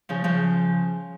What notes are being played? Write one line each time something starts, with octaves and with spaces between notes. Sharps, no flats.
C#3 F3
C#3 F3